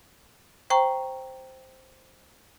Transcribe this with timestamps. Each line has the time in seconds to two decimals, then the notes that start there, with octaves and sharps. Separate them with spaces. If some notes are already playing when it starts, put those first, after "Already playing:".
0.70 C5 G5 A#5 C#6